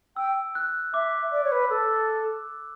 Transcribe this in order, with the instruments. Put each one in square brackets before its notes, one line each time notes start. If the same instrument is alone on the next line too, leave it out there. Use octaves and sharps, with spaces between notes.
[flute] G5 [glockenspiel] E6
[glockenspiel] F#6
[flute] E5 [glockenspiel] D6
[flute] D5
C#5
B4
[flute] A4 [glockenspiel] E6